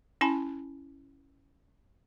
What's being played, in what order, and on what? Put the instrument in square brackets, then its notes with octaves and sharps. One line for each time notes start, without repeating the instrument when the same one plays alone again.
[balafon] C#4 E4 G#5 B5